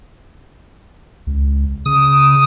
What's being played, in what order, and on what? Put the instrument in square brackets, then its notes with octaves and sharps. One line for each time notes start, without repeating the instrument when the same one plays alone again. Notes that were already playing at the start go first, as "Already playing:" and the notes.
[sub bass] C#2
[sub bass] C#3 [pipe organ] D#6